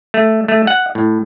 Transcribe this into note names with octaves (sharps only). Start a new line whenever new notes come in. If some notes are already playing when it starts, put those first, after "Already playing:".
A3
A3
F#5
A2